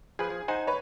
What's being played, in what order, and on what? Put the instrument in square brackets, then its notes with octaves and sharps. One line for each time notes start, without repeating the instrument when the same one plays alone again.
[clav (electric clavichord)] F3 B4 [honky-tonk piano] G#4
[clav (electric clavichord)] F3
[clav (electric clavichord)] D#4 C5 F#5 [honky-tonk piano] G#5
[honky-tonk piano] B4 C#5